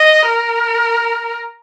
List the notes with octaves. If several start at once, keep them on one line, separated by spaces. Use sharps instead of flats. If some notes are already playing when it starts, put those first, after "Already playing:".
Already playing: D#5
A#4